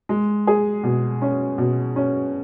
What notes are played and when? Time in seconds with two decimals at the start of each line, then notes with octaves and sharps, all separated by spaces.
0.09 G#3
0.47 G#4
0.83 B2
1.22 C#4
1.58 B2
1.96 C#4